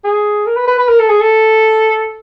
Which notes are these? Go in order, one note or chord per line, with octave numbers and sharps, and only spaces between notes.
G#4
A#4
B4
B4
B4
A#4
A4
G#4
A4